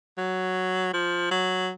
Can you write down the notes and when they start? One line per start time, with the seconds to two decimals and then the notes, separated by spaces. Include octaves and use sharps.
0.18 F#3
0.93 F3
1.31 F#3